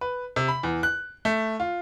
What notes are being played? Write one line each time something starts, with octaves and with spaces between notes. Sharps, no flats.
B4
C3
B5
E2
F#6
A3
F4